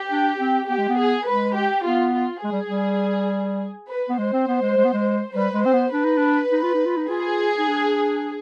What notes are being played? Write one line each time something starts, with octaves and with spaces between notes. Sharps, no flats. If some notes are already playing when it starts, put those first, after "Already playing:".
Already playing: G4
D4
C4
B3 G4
G#3
B3
G#4
G#3 B4
G4
B3 F4
F4
G#3 G#4
G3
G3
B4
B3
G#3 C5
C4
B3
G#3
G#3
B3
G#3
G3 B4
G#3
C4 C5
B3
D4 B4
D#4
D4
D#4
F4
D#4
F4
D#4
F4 G#4
D#4
D4